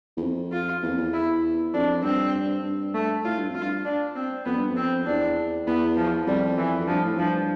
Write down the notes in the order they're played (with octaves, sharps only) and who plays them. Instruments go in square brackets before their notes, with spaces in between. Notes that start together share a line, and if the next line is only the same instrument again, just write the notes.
[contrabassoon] E2
F2
[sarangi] F4
[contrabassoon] E2
F2
E2
[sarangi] E4
[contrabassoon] F2 [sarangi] D4
[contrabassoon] G2 [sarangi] C4
[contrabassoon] G2
[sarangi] A3
[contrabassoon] A2 [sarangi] F4
[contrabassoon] G2
F2
[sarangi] F4
[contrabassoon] G2
[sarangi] D4
C4
[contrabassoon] F2 [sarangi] B3
[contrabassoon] G2
F2
[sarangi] C4
[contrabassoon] E2 [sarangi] D4
[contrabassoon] E2 [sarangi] B3
[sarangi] F3
[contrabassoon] F2 [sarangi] G3
[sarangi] E3
[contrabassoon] F2
[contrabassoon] G2 [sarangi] F3
[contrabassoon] A2
[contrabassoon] G2 [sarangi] F3